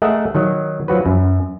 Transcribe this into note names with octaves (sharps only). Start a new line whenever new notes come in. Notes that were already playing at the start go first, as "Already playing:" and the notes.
A3 G#4 A#4 D#5 E5 F#5
D#3 F#3
F3 F#3 F#4 B4
F#2